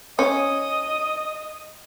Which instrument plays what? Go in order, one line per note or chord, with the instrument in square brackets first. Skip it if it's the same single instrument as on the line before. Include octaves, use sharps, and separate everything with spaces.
[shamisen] C#4 [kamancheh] D#5 D#6